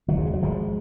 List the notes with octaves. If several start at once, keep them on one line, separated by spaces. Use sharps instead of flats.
D#3 F#3
D#2 C#3
G#3
F#3
G#1 F3 G#3